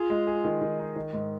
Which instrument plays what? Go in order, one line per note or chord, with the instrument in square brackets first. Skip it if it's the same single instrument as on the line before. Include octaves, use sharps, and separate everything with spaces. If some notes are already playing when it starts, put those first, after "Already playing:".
Already playing: [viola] F4 [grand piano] G#4
[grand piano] G#3
G#4
D#3
D#3
D#4
D#3
G#2